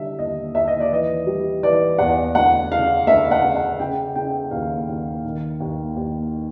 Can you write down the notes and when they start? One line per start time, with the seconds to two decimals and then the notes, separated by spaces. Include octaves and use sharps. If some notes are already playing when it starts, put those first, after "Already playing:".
Already playing: D3 G3 E5
0.19 D#2 D#5
0.55 D#2 E5
0.68 D#5
0.80 D5
0.91 E3 D#5
1.27 G3
1.63 E3 D5
1.99 E2 F#5
2.35 D2 F#5
2.71 C#3 F5
3.07 D2 E5
3.25 F5
3.31 F#5
3.44 C#3
3.56 F#5
3.80 C#3 G5
4.16 C#3 G5
4.51 D#2 F5
4.88 D#2
5.24 D#3
5.60 D#2
5.96 D#2